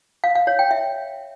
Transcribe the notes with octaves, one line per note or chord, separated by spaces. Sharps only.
F5
F5
C#5
G5
E5